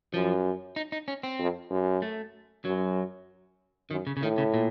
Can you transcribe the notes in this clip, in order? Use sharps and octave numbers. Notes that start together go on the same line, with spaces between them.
F#2 F3
D#4
D#4
C#4
C4
F2
F#2
A3
F#2 F#3
F#2 D#3
C#3
C#3
A2 D#3
C#3
A#2